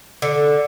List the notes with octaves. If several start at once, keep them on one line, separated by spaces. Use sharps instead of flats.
D3